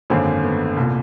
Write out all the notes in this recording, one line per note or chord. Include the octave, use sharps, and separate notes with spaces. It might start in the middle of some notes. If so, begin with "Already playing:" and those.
G#1 F#2 D3 A#3 C4
A3 B3
C2 A#2